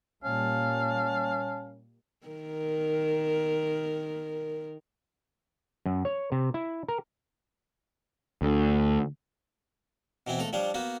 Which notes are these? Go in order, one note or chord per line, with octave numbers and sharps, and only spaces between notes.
A#2 G3 A#3 C#4 F5 A5
D#3 A#4
F#2
C#5
C3
E4
A#4
D2
B2 E3 C4 E4
C#2 A3 A4 A#5
F3 G3 D4 C#5
A#3 B3 F#4